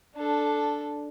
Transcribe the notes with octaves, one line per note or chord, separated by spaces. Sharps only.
D4 A4